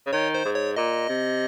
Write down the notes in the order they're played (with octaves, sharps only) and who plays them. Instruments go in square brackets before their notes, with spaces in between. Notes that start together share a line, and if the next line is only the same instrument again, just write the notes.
[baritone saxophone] C#3
[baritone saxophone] D#3 [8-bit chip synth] C#5
[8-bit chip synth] C5
[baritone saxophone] G#2
[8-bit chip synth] C#5
[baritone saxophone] A#2 [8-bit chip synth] D#5
[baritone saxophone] C3